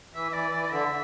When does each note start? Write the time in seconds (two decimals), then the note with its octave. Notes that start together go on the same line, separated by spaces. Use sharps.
0.15 E3 E5
0.29 E5
0.33 E3 D5
0.52 E3 D5
0.63 D5
0.70 D3 E5